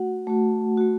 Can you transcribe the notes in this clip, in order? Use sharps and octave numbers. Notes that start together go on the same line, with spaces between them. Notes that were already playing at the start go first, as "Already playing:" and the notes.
Already playing: A3 F#4 F#5
A3 F#4
A3 F#4